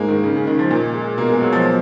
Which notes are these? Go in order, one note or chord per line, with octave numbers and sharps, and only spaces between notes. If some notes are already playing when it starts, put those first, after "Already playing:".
Already playing: G#2 G#3 A#3
D#3
C#3
C#3
D#3
F3
A#2
G#3
B2 A#3
G#3
F#3
F3